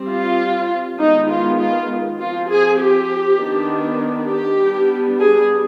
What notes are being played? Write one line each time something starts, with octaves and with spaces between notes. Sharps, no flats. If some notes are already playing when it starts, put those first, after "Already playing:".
Already playing: G3 C4
F4
D#3 G#3 B3 D#4
F4
F4
F3 C4 F4
G#4
G4
D#3 B3 D4
G4
G3 B3 D4
G#4